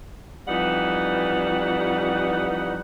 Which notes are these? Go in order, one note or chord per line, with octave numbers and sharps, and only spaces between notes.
F2 E3 G3 D#4 B4 F#5